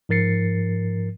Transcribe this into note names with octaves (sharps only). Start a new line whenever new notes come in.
G#2 F3 A#4 A6 C7 C#7